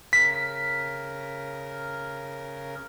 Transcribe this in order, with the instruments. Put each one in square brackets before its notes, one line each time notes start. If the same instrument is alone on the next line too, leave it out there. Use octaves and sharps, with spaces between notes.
[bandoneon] C#3 A#4 [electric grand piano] B6